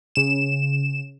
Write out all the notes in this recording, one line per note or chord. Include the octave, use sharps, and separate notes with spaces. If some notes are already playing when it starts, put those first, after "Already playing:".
C#3 E7